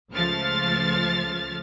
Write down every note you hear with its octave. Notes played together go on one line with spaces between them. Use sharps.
C#2 F3 A3 C5 F6 A6